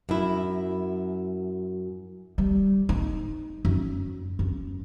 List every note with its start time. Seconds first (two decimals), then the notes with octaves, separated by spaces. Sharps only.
0.09 F#2 E4
2.38 G3
2.89 D#4
3.65 F#2
4.39 F#2